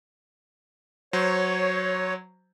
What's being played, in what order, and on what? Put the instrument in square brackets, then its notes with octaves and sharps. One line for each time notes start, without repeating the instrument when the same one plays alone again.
[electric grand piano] F#3 C5 [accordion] C#5